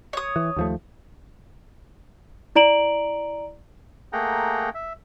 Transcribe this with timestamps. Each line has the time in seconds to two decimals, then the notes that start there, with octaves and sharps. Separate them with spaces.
0.13 C#5 D#6
0.36 E3
0.56 D#2 F3 A3
2.56 E4 D5 A#5 D7 F#7
4.13 A3 A#3 G#4 F#5 G5 A#5
4.75 E5